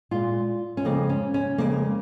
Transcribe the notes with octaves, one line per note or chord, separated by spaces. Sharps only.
A#2 G#3 F4
C#4
F2 C#3 G#3 A#3
C#4
C#4
F2 C#3 G#3 A#3